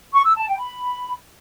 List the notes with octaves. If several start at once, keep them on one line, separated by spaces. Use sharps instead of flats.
C#6
E6
A5
G5
B5